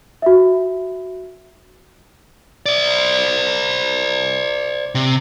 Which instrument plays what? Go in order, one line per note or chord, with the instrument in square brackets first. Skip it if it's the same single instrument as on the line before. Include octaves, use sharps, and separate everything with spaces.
[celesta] F#4 E5
[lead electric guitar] C5 D5
C3